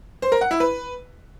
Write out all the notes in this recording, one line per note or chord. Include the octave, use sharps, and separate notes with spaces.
C5
A#4
F#5
E4
B4